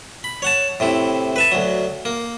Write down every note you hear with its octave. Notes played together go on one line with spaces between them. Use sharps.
B5
C#5 F#5 A5
A2 C3 E4
B4 E5 A5
D2 F#3
A#3